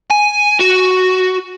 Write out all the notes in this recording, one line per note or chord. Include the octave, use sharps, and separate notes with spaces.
G#5
F#4